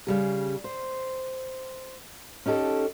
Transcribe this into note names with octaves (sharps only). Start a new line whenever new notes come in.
C#3 G3 G#4
C5
C#4 D#4 G4 A4